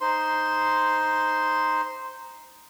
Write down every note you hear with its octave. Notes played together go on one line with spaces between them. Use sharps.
D#4 C5 C6